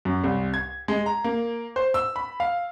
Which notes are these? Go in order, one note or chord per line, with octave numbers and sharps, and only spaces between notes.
F#2
C2
G#6
G#3
A#5
A#3
C5
E6
B5
F5